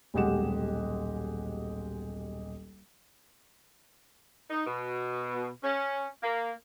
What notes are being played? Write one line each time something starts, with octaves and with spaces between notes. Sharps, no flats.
D#1 B1 G#3 G4 F#5 E7
D#4
B2
C#4
A#3